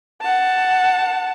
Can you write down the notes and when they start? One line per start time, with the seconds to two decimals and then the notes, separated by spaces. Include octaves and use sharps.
0.21 F#5 A5